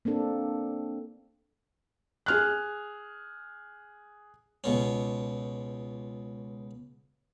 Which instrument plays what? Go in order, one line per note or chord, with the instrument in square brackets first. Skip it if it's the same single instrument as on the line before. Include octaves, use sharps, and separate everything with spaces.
[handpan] A#3 C4 D4 A4
[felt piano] G#4 F6 F#6
[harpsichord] C#2 B2 C#4